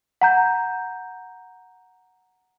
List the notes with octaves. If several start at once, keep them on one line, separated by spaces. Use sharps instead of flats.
F#5 A#5 G6